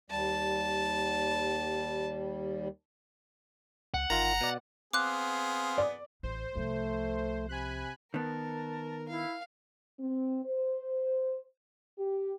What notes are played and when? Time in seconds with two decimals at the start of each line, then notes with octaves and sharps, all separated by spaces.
0.10 D#2 G3 A5
3.94 C#2 F#5
4.10 G1 D#3 F4 A#5
4.41 B2 D5
4.93 B3 C4 G#4 F5 C6 D6 F#6
5.78 D5
6.23 A1 C5
6.55 C2 F3 A3
7.49 C3 G#5 B5 F#6
8.14 D#3 B3 A#4 A5
9.09 E4 F5
10.00 C4
10.46 C5
11.99 G4